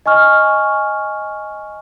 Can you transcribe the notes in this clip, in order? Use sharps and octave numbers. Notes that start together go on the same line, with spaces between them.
D#5 G#5 C#6 F6